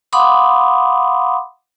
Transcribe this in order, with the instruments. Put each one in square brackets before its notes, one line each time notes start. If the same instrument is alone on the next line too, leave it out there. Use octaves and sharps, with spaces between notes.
[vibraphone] F5 F#5 B5 C6 D6 D#6